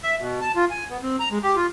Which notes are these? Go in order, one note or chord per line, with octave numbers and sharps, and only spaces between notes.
E5
B2
A5
F4
G#5
B3
C4
A#5
G#3
G4
F4